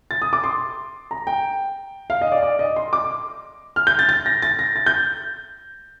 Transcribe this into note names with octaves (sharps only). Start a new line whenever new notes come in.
A6
D#6
D6
C6
A#5
G5
F5
D#5
D5
D5
D#5
C6
D6
F6
G6
A6
A6
A#6
A6
A#6
A6
G6